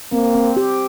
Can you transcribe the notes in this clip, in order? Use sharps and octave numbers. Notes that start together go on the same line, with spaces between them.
A#3 C4
C4
G4